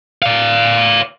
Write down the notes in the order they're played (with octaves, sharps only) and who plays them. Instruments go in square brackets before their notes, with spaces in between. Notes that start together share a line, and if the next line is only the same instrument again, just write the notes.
[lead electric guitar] D5 F5